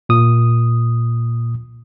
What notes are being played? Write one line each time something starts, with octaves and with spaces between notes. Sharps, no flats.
A#2 D#6